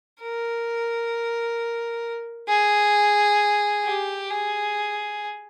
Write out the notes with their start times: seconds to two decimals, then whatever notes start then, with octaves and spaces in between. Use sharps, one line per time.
0.22 A#4
2.48 G#4
3.85 G4
4.30 G#4